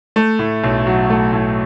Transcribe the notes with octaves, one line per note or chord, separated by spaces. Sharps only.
A3
A2
B1
F#3
A3
A2